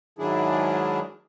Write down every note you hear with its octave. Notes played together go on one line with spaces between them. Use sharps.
G#2 D#3 F#3 D4 E4 G#4